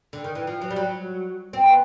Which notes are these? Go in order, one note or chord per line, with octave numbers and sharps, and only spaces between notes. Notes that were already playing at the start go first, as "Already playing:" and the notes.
D3
D#3
E3
F3
F#3
G3
F#3
C4
B3